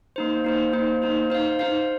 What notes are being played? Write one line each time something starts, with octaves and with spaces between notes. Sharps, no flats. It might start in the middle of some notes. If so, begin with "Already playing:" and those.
A#3 D#4 C5
A#3 D#4 C5
A#3 D#4 C5
A#3 D#4 C5
D#4 C5 F5
D#4 C5 F5